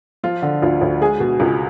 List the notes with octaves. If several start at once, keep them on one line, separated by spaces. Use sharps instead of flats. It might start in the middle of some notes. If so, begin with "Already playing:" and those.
F3 F4
D3
D2 F4
D2
G#3 G#4
B2
C#2